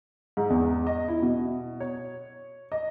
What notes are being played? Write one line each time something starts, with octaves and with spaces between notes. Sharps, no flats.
G#2
E2
D#5
E4
B2
C#5
D#5